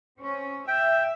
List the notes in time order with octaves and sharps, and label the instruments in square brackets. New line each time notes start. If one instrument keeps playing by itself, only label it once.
[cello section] C4 C#4
[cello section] E5 [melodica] G5